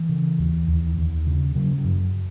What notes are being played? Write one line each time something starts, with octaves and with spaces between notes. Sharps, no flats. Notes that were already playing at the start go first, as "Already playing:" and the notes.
Already playing: E3
C#3
D#2
D#2
D#2
C#3
C#3 F#3
F#3
F#2